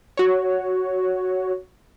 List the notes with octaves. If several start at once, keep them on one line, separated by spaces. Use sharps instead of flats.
F#4 C#5